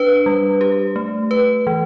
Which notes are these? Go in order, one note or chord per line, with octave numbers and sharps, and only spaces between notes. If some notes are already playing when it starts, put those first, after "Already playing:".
Already playing: D4 B4
G3
G4
A3
B4
E3